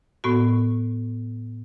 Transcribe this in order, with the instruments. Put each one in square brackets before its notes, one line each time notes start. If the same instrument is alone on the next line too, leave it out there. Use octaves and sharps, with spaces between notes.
[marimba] A2 B3 F#4